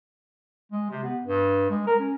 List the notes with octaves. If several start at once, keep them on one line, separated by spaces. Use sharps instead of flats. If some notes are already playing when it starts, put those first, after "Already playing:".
G#3
C3
B3
G2
G#3
A#4
C#4